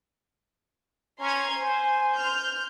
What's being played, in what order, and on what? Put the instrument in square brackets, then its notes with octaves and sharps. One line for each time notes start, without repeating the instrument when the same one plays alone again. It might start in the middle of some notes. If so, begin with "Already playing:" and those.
[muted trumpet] C#4 [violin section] A#5 C6 G#6
[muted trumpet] C5 [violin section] G#5
[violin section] F6 G6